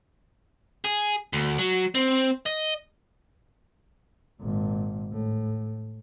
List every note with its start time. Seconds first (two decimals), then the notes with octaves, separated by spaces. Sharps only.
0.85 G#4
1.33 D2
1.59 F#3
1.95 C4
2.46 D#5
4.40 G#1 A#2
5.12 A2